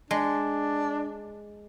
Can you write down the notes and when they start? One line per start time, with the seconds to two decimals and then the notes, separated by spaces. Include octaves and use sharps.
0.11 G#3 D4